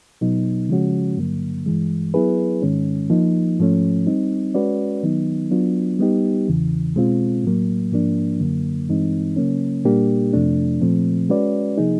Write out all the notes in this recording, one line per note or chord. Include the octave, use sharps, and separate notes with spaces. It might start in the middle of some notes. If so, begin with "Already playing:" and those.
B2 F#3 B3 D#4
C#3 F3 G#3 C#4 F#4
G2 D3 F#3 A#3
G2 E3 G#3
F#3 B3 E4 G#4 B4
G#2 D#3 G#3 C#4
F3 A#3 D#4
G#2 F3 A3 C#4
G3 C4 D#4
G#3 C#4 F#4 B4 D5
D#3 F#3 B3 D#4
F#3 B3 D4 F4
G3 B3 D#4 G4
E2 C#3 E3
B2 G#3 C4 F4
A2 F#3 A#3
G#2 F3 A#3 D4
F#2 D3 F#3 A#3
G2 E3 G#3 C4 D#4
C#3 F#3 A#3 C#4
A#2 G3 A#3 D4 G4
F2 C3 F3 A3 D4
A#2 F3 A3 C4
G#3 C#4 F#4 B4 D5
C3 F3 A#3 D#4 G#4